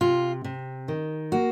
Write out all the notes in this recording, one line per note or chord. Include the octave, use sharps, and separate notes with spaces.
C3 F4
C3
D#3
A#3 F#4